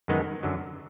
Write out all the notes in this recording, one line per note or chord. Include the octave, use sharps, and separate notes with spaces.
F#2 D#3 G#3 B3 D#4
F#2 D3 F#3